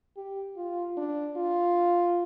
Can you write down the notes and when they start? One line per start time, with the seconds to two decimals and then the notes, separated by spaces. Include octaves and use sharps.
0.17 G4
0.57 F4
0.97 D4
1.37 F4